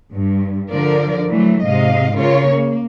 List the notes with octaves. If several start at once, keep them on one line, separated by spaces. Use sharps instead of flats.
G2
D3 F3 A#4 D5
E3 F#3 A3
G#2 C3 D#5 F5
C#3 F4 A#4 C#5
A#3